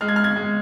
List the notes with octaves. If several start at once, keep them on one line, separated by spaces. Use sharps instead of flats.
G#3 F6
G#6
F6
G#6
G#3